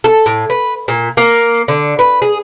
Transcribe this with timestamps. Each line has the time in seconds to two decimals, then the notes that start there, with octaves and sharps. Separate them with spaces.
0.04 A4
0.26 A2
0.50 B4
0.88 A#2
1.17 A#3
1.68 D3
1.99 B4
2.22 G#4